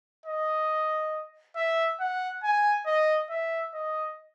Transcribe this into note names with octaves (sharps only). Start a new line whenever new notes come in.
D#5
E5
F#5
G#5
D#5
E5
D#5